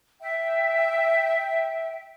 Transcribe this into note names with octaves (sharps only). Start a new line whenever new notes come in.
E5 G5